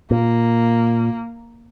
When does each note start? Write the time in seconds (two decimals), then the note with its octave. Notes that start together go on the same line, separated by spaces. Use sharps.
0.11 A#2 A#3